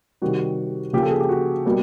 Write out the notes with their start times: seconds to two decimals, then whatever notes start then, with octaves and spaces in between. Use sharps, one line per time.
0.22 C3 D#3 G3 F#4
0.93 C#3 F3 A#3 G4
1.03 A4
1.11 G#4
1.20 G4
1.29 F#4
1.66 B2 G3 A#3